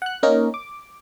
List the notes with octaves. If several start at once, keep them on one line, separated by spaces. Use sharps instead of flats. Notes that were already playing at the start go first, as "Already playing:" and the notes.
F#5 F#6
A#3 C#4 D#4 A#4
D6